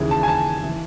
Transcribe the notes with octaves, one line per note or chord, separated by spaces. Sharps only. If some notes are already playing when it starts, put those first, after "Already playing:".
Already playing: D#2 C#3 E3
A5
G#5
A5
E3